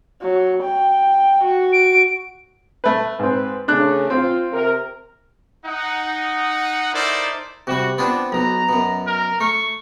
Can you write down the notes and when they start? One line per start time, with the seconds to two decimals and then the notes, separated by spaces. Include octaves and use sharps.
0.22 F#3
0.63 G5
1.43 F#4
1.73 D7
2.84 A3 B4
3.19 G#2 C4 B4
3.68 C#3 A3 D4 F#6
4.10 C4 F4
4.52 C3 A#4
5.66 D#4 F#5
6.93 D#4 E4 A4 A#4 C5 D5
7.67 C3 G3 F#4
7.98 B3 C4 D4 F4
8.32 B1 B2 A#5
8.69 F#2 B2
9.07 A#4
9.41 A3 C#6